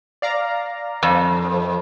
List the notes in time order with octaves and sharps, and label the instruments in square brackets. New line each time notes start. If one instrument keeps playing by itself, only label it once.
[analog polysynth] D5 F5 A#5
[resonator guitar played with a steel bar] F2